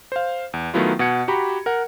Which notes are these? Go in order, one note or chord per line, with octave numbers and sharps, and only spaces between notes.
C5 F5
E2
D#3 F#3 A3 B3 E4 F4
B2 F#5 G#6 C#7
F#4 G4 A#5 B5
A#4 F#5